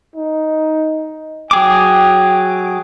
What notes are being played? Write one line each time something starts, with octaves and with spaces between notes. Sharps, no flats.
D#4
F#3 G#4 G5 D6